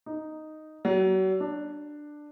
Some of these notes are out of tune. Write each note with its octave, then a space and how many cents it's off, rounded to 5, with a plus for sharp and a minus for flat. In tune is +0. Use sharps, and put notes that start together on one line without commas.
D#4 -5
F#3 +35
D4 +10